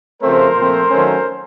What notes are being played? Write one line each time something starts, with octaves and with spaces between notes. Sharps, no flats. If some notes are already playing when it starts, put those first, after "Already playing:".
C#3 F3 A3 C4 A#4 C5
A#2 F3 A3 C4
D#3 F#3 A3 C#4